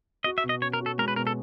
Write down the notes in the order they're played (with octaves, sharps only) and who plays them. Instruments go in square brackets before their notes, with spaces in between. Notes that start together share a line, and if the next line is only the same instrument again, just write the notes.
[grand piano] F#4 [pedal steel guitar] D#5
[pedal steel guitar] E5
[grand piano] B2
[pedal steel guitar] D#5
[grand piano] C#4 [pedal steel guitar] C#5
[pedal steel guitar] A#4
[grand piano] F#4
[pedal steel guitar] A4
[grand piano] G#3 [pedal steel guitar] A#4
[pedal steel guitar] B4
[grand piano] B2 [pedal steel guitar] A#4
[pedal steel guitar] A4